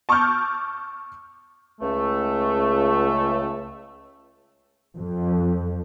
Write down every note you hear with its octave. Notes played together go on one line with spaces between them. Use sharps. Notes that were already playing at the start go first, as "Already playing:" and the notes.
A5 C#6 D6 E6 F6 G6
C#2 A3
F2